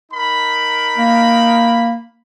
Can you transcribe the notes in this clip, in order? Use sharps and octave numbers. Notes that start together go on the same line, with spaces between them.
D#4 A#4 B5
A#3